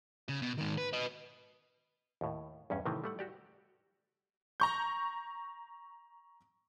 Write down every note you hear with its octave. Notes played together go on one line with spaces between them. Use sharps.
C#3
B2
G#2 D#3
B4
B4 D#5
D#2 A2
E2 G2 C#4
A2 C3 D#3 E3 A3 C4
G3 A3 F#5
F#4 G4 D5
A#5 C#6 G6